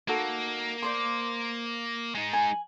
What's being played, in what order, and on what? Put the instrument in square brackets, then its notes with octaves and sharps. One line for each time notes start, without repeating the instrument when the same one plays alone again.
[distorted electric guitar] A#3 [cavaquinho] D#4 F#4 A4
[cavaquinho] C5 D5 C6
[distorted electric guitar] G#3 D#4
[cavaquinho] G#5